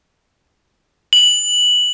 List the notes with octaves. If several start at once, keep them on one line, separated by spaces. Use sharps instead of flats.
F#7